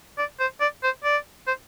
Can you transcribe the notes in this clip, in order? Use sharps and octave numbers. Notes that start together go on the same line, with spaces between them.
D5
C5
D5
C5
D5
C5